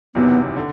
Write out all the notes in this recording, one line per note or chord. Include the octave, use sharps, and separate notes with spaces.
F#1 E2 C3 D#3 F#3 B3
D3